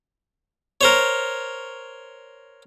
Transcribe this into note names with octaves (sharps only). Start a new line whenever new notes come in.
A#4 C5 C#5